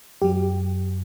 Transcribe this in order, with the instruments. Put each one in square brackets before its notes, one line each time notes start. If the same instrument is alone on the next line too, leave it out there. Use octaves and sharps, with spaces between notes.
[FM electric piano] F#2 F#3 G4